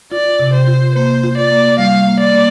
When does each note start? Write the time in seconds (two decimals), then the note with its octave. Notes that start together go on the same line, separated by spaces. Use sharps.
0.12 F4 D5
0.39 C3
0.53 C5
0.67 F4
0.95 A#3 C5
1.24 F4
1.37 D5
1.51 A#3
1.78 G3 F5
2.07 A#3
2.20 D5
2.33 A#3